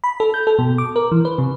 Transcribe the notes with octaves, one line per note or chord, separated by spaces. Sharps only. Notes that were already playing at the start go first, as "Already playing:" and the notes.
B5
A4
G6
A4
B2
D6
A#4
E3
B4
C3